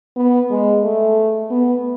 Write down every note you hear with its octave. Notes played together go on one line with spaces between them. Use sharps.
B3
G#3
A3
B3